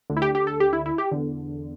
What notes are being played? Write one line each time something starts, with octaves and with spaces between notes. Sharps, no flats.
D2 D3
E4
G4
G4
A4
G4
E4
E4
G4
E2 D3